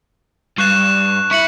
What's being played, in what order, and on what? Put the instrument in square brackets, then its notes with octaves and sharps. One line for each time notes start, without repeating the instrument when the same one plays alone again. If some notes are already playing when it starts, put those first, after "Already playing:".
[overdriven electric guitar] G2 [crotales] C#6 F#6 E7
[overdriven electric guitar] E4 [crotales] C#6 C#7 F#7